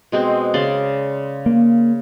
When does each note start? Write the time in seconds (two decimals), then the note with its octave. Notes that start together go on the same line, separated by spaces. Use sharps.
0.12 B2 G#3 C4
0.54 C#3 D5 C6
1.46 A#3